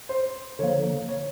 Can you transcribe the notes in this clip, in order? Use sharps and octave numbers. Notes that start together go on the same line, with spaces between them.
C5
D3 F3 A#3 C#5
C#5